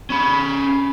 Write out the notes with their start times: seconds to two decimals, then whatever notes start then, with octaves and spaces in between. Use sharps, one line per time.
0.10 C#4 B5